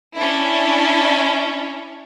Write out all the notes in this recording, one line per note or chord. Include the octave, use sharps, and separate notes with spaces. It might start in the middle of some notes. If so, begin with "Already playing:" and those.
C#4 D4 E4